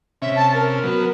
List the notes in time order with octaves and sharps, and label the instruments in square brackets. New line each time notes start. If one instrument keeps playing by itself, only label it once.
[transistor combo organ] C3 C#4 [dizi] E5
[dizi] A5
A#4
[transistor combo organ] F#3 B3